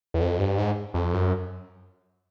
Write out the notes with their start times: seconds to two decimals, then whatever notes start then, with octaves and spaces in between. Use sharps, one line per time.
0.14 E2
0.21 F2
0.39 G2
0.58 G#2
0.94 F2
1.13 F#2